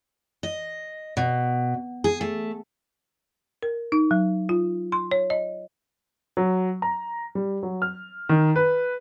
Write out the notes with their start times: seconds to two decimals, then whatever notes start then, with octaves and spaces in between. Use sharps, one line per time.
0.43 D#5
1.17 B2
2.04 G#4
2.21 A3
3.63 A#4
3.92 D#4
4.11 F#3
4.49 F4
4.92 C6
5.11 C#5
5.30 D#5
6.37 F#3
6.82 A#5
7.35 G3
7.63 F#3
7.82 F6
8.29 D#3
8.56 B4